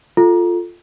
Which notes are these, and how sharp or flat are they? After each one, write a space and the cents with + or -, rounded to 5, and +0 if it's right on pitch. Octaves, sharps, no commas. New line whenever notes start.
F4 +0 A4 +0